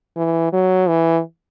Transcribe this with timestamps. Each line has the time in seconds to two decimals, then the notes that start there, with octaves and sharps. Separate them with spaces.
0.17 E3
0.53 F#3
0.88 E3